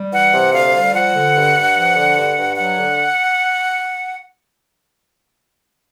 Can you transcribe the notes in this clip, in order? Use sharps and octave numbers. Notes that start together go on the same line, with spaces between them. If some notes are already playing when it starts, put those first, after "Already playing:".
Already playing: G3
E3 F#5
C3
D2 F5
G3
F3 F#5
D3
G2
G2
F3
D3
G2
G2
F#3 F#5
D3